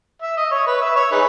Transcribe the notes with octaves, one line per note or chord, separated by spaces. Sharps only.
E5
D#5
C#5
B4
E5
C#5
D#4 G#4 B4